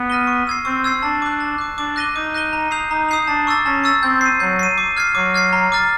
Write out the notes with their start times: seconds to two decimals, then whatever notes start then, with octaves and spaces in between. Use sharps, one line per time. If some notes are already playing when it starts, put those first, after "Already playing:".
Already playing: B3
0.10 F6 A#6 D#7 G7
0.27 C#6
0.47 E6 G#6 C7
0.65 C4 C#6
0.84 E6 G#6 C7
1.03 D4 A5
1.22 D6 F#6
1.40 A5
1.58 D6 F#6
1.78 D4 D6
1.96 F#6 A#6 D#7 G7
2.15 D#4 D6
2.34 F#6 A#6 D#7 G7
2.53 A#5
2.71 D#6 G6 C7 F7
2.90 D#4 A#5
3.08 D#6 G6 C7 F7
3.28 D4 A5
3.47 C#6 E6 A6
3.65 C#4 A5
3.84 C#6 E6 A6
4.02 C4 G6
4.21 C7 D#7
4.40 F#3 G6
4.59 C7 D#7
4.78 D6
4.97 F6 G#6 C7
5.15 F#3 D6
5.34 F6 G#6 C7
5.53 A#5
5.72 D6 F6 A6